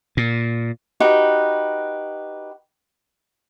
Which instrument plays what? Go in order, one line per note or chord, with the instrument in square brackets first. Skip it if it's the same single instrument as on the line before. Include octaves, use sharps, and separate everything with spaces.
[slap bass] A#2
[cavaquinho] D#4 F#4 G4 B4